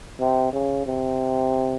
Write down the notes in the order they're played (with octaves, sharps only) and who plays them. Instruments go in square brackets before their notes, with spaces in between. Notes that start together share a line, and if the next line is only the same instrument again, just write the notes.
[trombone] C3
C#3
C3